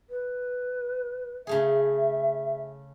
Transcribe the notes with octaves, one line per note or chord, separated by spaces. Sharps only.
B4
C#3 A3 G#4 E5